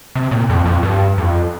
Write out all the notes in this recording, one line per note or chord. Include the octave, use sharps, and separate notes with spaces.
C3
A#2
F2
F2
G2
F2